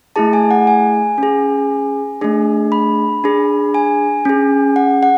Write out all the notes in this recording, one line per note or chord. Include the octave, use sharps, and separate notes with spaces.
A3 E4 G#4 A5
G#5
F#5
G#5
C#4 G#4
A3 D4 G#4
B5
D4 G#4
G#5
C#4 G#4
F#5
F#5